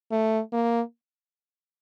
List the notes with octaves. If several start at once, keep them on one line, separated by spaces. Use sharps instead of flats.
A3
A#3